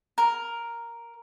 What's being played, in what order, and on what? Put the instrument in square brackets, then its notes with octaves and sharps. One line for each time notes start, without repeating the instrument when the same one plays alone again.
[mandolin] A#4